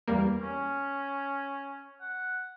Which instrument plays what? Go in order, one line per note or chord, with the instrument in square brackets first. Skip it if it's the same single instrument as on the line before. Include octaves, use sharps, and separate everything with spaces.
[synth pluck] E2 G3 A#3
[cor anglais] C#4
F#5